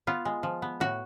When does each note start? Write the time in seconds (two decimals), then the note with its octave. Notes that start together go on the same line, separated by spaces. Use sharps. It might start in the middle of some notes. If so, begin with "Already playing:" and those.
0.07 B3 F4
0.25 G#3
0.43 F3
0.62 B3
0.80 A2 F#4